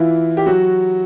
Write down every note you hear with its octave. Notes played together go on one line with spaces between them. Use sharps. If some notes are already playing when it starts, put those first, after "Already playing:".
Already playing: E3 E4 F4
G4
F#3 F#4